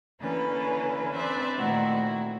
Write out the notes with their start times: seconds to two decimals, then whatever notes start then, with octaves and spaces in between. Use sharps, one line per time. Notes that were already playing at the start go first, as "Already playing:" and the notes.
0.20 D3 E3 A#3 C#4 E4 B4
1.15 C4 D4 B4 C5 D5 E5
1.57 A#2 D#3 A3 C4 E4 F#4